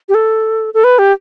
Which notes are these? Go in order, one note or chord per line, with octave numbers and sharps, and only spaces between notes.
G4
A4
A4
B4
G4